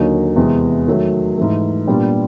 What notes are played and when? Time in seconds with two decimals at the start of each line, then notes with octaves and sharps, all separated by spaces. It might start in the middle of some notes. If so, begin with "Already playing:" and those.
Already playing: D#2 D3 F#3 A#3 D#4
0.36 E2 C3 E3 G#3 C4
0.88 D#3 F#3 A3
1.37 G#2 E3 A3
1.87 A#2 G3 B3 D4 G4